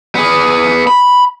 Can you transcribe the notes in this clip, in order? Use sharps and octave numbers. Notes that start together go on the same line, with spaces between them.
B3 G#4
B5